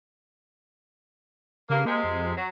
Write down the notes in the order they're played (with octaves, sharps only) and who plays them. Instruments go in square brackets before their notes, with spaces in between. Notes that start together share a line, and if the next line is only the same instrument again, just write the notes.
[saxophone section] G2 A#3 [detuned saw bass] C#3
[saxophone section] C3 G#3 [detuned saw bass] A#3
[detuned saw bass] F2
[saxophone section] F#3